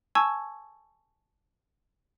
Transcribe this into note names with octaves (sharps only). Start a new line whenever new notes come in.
G#5 A5 C#6 E6 G#6